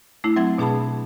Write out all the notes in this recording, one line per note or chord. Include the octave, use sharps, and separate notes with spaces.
A3 D4 E4
F#3 C4 E5 F#5 G#6
B2 D4 G#4 A5 B5